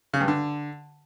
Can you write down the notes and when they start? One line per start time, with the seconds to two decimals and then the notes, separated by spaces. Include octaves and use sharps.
0.14 C#3
0.21 G2
0.28 D3